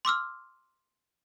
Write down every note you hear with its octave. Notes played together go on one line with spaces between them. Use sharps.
C6 D6 E6 F6